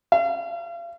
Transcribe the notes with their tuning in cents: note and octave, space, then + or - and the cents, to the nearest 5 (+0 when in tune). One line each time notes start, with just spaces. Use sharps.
F5 -40